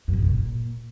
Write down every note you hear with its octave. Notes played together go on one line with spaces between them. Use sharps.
F#2
A2
B2
A#2